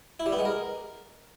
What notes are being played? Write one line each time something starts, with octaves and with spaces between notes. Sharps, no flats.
E4
G3
B3
G#3
A#4